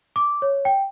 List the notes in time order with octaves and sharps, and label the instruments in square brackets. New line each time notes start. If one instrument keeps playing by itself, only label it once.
[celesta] D6
C#5
G5